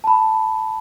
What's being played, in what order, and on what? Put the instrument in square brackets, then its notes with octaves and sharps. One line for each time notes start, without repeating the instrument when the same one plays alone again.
[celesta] A5 B5